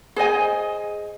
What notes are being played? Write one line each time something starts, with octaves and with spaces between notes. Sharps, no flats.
G#4 C5 D#5 G#5